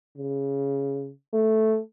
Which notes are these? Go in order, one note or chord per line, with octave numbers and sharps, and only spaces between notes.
C#3
A3